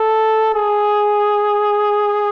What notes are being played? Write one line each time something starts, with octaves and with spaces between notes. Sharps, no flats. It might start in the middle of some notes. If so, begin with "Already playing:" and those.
Already playing: A4
G#4